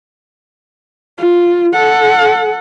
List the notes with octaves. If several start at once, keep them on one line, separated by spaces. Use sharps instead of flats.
F4
A4 F#5